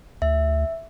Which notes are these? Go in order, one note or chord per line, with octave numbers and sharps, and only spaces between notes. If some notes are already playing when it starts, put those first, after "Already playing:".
D2 E5